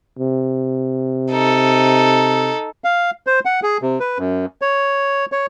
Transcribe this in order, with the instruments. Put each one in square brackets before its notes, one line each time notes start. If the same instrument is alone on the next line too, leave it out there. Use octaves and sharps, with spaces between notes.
[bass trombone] C3
[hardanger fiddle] D#4 A4
[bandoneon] F5
C5
F#5
G#4
C3
B4
F#2
C#5
C#5